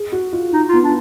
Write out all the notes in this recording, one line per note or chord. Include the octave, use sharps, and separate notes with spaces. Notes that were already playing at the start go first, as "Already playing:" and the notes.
Already playing: G#4
F#4
F4
D#4
F4
B3
D4